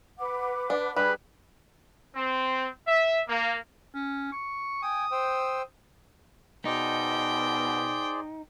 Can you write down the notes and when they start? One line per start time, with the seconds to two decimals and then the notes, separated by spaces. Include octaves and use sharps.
0.18 B4 F#5 D6
0.70 D4
0.96 G3 D4 G#4 B4
2.15 C4
2.88 E5
3.29 A#3
3.94 C#4
4.32 C#6
4.82 G5 G#5 D#6
5.11 C5 G5 E6
6.65 B2 D#4 G#4 C5 D5 G5